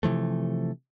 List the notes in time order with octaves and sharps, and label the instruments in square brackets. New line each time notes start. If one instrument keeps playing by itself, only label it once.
[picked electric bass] C3 E3 F3 A3